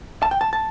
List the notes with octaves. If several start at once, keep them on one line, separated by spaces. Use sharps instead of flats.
A5
G5
A5
A5